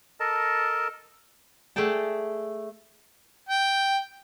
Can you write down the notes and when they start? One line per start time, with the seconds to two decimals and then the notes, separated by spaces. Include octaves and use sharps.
0.20 A4 A#4 D#5 A5
1.76 A3 G#4 D5 G5 A5
3.49 G5